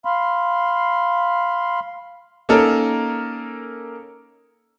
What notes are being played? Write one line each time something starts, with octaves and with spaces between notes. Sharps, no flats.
F5 B5 C6
A#3 C#4 D#4 A4 A#4